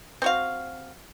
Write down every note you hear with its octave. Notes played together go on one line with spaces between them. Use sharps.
C4 F#4 F5